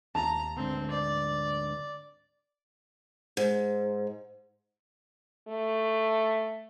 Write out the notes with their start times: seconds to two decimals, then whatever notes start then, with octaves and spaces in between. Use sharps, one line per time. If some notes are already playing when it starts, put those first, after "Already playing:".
0.15 D#2 A5 A#5
0.57 D2 G#2 D3 C4
0.91 D5
3.37 G#2
5.48 A3